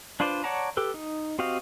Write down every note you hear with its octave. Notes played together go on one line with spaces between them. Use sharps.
D4 F4 B4 C5 D5
C#5 D5 F#5 A5 A#5
G4 A4 B4
D#4
C4 F#4 G4 D#5 F5